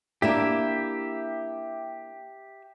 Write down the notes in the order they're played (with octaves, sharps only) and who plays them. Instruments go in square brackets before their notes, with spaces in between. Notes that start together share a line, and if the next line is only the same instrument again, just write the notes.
[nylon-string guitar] A#3 D4 E4 [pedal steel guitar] G4 E5